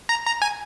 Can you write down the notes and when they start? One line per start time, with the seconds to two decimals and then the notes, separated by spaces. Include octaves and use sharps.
0.09 A#5
0.26 A#5
0.42 G#5